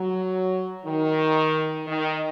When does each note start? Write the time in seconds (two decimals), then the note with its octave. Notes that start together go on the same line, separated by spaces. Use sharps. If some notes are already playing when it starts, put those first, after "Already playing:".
Already playing: F#3
0.85 D#3
1.87 D#3